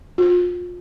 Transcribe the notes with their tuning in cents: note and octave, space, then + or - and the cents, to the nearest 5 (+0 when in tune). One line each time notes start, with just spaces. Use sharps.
F4 +30